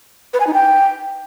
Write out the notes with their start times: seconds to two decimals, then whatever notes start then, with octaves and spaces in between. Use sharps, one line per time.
0.33 B4
0.40 G#5
0.47 D#4
0.54 G5